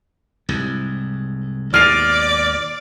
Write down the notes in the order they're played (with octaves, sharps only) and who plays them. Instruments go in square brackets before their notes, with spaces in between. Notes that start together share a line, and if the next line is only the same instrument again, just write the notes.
[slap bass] C2 G#2
[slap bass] D#2 G#2 B2 [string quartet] D5 [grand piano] F6 C7 F7